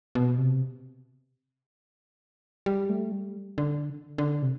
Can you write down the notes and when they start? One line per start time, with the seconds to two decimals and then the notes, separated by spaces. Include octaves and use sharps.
0.15 B2
0.38 C3
2.66 G3
2.89 A3
3.12 G3
3.58 D3
4.18 D3
4.42 C3